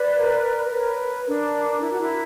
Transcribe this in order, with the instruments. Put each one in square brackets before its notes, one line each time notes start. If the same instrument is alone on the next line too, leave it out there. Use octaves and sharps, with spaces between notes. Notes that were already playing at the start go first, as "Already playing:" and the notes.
Already playing: [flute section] B4 D5
[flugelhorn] A#4
[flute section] A#4 C#5 [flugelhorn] B4
[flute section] D4 [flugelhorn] A#4
[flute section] E4 [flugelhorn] A#4
[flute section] F#4
E4